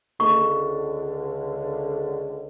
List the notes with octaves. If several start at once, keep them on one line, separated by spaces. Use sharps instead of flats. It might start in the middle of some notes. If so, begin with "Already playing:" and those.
C#2 D3 C#6